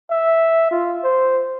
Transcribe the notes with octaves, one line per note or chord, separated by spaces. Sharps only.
E5
F4
C5